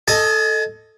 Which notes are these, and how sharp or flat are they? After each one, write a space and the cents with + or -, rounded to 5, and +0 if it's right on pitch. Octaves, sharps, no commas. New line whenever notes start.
A4 +0 D#5 +0 G#5 +35